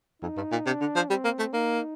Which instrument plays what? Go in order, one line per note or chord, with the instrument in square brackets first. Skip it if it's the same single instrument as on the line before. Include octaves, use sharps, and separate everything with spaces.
[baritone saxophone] F2 [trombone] D#4
[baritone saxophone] G2
A#2
[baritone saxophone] C3 [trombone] D4
[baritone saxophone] D3
F3
[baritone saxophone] G3 [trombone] C4
[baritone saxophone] A#3
A3
[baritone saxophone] A#3 [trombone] D#4